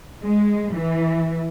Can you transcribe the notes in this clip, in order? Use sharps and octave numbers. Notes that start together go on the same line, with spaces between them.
G#3
E3